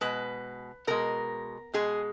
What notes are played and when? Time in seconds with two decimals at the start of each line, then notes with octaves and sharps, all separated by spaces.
0.01 B2 G#3 B4
0.87 B2 G#3 A#4
1.73 B2 G#3 G#4